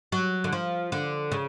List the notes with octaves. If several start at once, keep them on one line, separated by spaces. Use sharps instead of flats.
F#3
D3
F3
D3
C#3